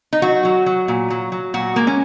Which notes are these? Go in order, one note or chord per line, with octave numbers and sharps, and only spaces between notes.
D#4
F#3 F#4
F#3
F#3
A#2
F#3
F#3
A#2 F#4
G#3 A#3
C#4